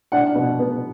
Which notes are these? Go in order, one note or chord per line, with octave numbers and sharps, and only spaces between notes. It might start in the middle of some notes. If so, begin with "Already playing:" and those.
D4 F#5
B2
B3